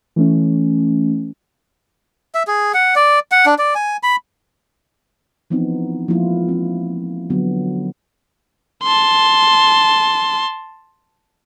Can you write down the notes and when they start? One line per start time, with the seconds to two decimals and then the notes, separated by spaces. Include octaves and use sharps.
0.16 E3 A3 C#4
2.35 E5
2.47 G#4
2.74 F#5
2.96 D5
3.32 F#5
3.46 D4
3.58 D5
3.75 G#5
4.03 B5
5.50 E3 F3 B3 C4 D#4
6.08 F3 G#3 A#3 E4 F4
6.49 C4
7.30 D3 F#3 B3
8.83 A5 C6